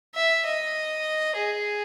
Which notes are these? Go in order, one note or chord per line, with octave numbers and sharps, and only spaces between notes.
E5
D#5
G#4